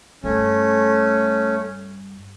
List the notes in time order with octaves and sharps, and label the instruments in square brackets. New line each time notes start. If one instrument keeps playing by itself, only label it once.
[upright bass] G2 [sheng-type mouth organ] A3 C#4